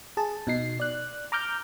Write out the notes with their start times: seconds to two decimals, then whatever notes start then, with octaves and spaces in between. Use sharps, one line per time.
0.17 G#4 A5
0.47 B2 D#4 C7
0.80 D5 F#6
1.32 A#5 D6 F6 G6